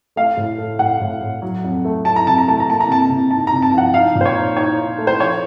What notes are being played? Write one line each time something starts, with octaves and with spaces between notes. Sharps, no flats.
A3 F5
A2
A3
A2 F#5
A2
A2
F#3
F2
A3
F#3 A5
A#5
C3 A5
A#5
A3 A5
A#5
A#3 A5
A#5
C3 A5
C3
D#4 A5
C3 A#5
A5
F3 F#5
D#4 F5
A#2
C5
C#5
D#4
D#4 C#5
D#4
A3
C5
F3 C#5